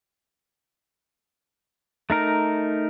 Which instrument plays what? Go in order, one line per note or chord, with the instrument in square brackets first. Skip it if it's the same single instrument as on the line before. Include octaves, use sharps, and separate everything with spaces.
[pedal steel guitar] A3 D#4 A#4